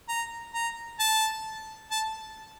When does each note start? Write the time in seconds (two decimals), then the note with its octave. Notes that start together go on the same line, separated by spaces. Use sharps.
0.08 A#5
0.54 A#5
1.00 A5
1.91 A5